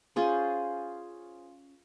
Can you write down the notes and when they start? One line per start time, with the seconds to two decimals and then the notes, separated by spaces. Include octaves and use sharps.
0.16 C#4 F4 G#4 C5